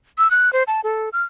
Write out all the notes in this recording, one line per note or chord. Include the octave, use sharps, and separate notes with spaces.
E6
F#6
C5
A5
A4
F6